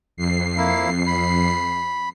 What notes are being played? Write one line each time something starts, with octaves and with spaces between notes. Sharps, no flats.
F2 C7
A#3 E4
B5